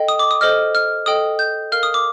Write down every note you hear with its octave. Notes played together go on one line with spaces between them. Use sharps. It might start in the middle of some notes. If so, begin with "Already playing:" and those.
Already playing: A4 D#5 G5
D#6
D6
D#6
A4 C5 D#5 F6
F6
A4 D#5 G5 D#6
G6
A#4 F5 F6
D#6
D6